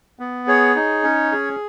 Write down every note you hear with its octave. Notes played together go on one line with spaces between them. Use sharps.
B3
G#4 C#5
D#4
C#4
G#4